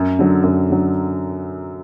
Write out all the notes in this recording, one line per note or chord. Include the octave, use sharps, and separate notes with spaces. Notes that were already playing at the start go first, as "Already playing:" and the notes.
Already playing: F#2
D3 F#3
F#2
D3 F#3